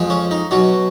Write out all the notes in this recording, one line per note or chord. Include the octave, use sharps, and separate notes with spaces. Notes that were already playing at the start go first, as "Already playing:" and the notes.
Already playing: F2 F3 G#3
C#4
D#4
B2 F#3 C#4